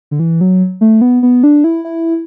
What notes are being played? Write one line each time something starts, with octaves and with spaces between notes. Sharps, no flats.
D3
E3
F#3
A3
B3
B3
D4
E4
E4